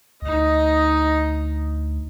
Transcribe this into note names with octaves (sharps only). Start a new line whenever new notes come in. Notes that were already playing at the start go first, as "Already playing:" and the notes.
D2 D#4 D#5